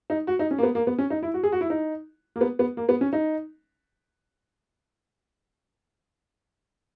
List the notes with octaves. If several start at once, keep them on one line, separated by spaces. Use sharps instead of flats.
D#4
F#4
D#4
C#4
A#3
B3
A#3
B3
C#4
D#4
E4
F#4
G#4
F#4
E4
D#4
A#3
B3
B3
A#3
B3
C#4
D#4